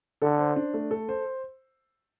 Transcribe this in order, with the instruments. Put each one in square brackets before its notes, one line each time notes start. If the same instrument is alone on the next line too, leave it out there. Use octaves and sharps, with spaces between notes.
[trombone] D3 [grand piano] A4
[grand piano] C5
D4
A3
A4
C5